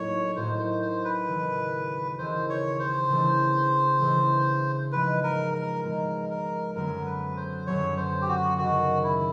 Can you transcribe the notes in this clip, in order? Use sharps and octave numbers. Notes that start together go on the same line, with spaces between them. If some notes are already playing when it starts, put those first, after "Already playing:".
Already playing: A2 F#3 A#3 D#4 F#4 C#5
A2 F#3 A#3 D#4 F#4 C5
C5
C5
B4
D#2 C#3 E3
D#2 C#3 E3 C5
C#5
C5
C#3 E3 A3 D4
C#3 E3 A3 D4
G#2 F3 G#3 B3 D#4 B4
A#4
A#4
G#2 F3 G#3 B3 D#4 A#4
A#4
F#2 D3 F#3 B3 A#4
B4
C5
F#2 D3 F#3 B3 C#5
C5
G4
F#4
D#2 C#3 F#3 F#4
E4